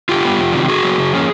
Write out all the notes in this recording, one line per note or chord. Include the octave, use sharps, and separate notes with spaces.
D3 F4 G4
G3 B3
F2
C3 D#3 F#3
D3 F#4 G#4
F#3 B3
C#3
F3 A#3 C#4